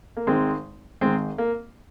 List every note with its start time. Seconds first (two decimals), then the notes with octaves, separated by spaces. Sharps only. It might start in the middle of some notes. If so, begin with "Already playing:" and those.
0.17 A#3
0.27 G#1 G#2 D#3 G#3 C4
1.01 G#1 G#2 D#3 G#3 C4
1.38 A#3